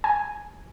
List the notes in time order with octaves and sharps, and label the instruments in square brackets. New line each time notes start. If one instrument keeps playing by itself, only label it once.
[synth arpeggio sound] G#5